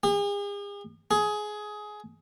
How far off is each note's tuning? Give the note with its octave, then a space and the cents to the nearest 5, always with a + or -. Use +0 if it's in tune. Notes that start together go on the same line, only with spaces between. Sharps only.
G#4 -45
G#4 +15